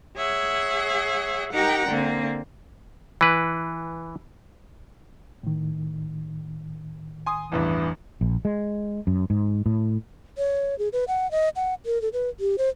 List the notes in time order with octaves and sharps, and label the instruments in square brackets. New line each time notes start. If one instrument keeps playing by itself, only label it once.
[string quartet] G#4 C#5 E5 F#5
D#4 G4 A#4 F#5 G5 A#5
D3 A#3 C4
[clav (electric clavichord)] E3 B4
[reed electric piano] A2 D#3
[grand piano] G#5 C6 D#6
[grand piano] A1 E2 G2 [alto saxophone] E3
[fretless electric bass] A#1
G#3
F#2
G#2
A2
[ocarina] C#5
G#4
B4
F#5
D#5
F#5
A#4
A4
B4
G4
C5